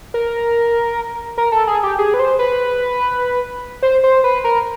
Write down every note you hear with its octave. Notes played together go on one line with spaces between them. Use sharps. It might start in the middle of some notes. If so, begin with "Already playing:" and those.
A#4
A#4
A4
G#4
G4
G#4
B4
C5
B4
C5
C5
B4
A#4